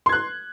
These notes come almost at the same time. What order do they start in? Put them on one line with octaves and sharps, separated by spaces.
C6 G#6 F#6